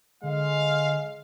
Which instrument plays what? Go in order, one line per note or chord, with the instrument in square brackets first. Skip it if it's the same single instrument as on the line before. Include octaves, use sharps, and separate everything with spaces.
[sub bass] D3 [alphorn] G#3 [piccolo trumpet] F5